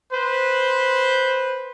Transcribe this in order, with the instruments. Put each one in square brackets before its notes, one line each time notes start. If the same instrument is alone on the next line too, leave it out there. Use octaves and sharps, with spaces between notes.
[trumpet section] B4 C5